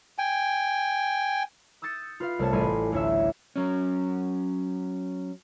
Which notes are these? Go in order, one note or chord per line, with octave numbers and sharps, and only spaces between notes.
G5 G#5
D#6 E6 G6 A6 C#7
F4 B4 F5
C2 A3 C5 C#5 A5
A1 G3 G#5 B5 C6 D#7
D2 A2 C#4 C#5 E5 E6
F#3 C#4